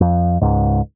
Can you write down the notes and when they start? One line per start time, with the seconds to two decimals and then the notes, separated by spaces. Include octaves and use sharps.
0.01 F2
0.42 C#2 G#2